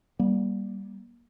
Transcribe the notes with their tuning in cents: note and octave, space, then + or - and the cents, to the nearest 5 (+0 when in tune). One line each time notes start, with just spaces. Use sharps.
G3 +0 A#3 +30